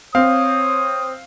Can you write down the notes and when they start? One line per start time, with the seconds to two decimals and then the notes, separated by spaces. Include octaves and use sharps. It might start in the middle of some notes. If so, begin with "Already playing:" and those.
0.15 C4 C#5 F5 D#6